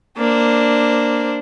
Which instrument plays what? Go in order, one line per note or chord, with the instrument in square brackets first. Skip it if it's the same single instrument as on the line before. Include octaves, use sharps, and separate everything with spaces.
[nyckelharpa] A#3 [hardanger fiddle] D4 C5